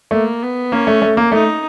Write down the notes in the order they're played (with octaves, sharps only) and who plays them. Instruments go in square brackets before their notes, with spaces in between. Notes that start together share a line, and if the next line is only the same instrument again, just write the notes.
[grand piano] A3 [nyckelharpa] A#3
[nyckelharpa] B3
[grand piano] A#3 [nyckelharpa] C#4
[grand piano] A3
A3
A#3
[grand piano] A3 [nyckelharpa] D#4